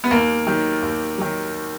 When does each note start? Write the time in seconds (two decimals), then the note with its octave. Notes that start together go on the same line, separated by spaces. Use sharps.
0.04 B3
0.11 D#2 A#3
0.47 D#3 F#3
0.82 D#2
1.18 D#3 F#3